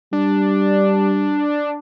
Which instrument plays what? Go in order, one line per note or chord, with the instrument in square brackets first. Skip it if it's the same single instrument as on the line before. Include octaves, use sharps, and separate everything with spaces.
[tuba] G3 [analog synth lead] D4